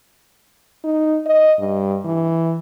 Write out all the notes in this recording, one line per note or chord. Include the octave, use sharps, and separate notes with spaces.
D#4
D#5
G2
E3